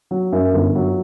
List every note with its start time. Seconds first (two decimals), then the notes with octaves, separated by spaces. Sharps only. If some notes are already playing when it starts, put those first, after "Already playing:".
0.11 F#3
0.32 F#2
0.54 G1
0.75 F#3